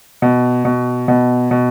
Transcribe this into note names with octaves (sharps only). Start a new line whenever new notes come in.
B2
B2
B2
B2